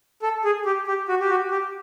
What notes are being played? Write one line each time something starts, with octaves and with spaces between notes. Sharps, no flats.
A4
G#4
G4
G4
F#4
G4
F#4
G4